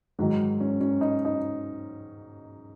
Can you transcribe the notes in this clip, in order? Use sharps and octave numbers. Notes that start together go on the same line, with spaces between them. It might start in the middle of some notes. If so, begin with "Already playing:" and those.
G#2 D#3 F#3
C#4
C#4
D#4
D#4